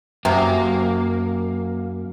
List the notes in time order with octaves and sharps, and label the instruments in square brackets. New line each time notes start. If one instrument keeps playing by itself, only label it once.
[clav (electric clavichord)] F#2 [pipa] C3 [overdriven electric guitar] A#3